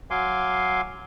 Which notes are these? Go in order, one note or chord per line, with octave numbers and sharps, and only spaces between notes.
F#3 F5 G#5 C6 D6